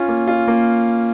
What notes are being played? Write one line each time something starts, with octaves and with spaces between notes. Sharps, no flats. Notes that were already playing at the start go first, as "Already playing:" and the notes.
Already playing: C#4 F4
A#3
F4
A#3